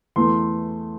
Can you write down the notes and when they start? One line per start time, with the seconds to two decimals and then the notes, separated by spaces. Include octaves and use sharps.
0.16 E2 E3 A3 C6